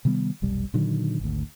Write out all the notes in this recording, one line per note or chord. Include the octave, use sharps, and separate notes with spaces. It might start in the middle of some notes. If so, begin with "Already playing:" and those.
C3 D#3 G3 B3
F1 B1 G3
A#2 D3 D#3 F#3
G#1 D2